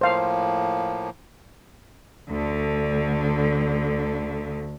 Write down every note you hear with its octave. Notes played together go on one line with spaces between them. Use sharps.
A2 F3 A#3 C5 F5
D2 D3